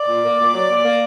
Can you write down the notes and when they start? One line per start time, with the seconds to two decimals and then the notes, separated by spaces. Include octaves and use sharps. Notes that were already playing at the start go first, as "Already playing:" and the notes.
Already playing: D5
0.08 A#2
0.24 A#3
0.39 A#2
0.54 F#3
0.69 A#2
0.84 A#3